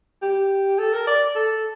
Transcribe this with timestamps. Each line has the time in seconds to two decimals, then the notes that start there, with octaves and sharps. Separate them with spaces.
0.22 G4
0.79 A4
0.93 A#4
1.07 D5
1.35 A4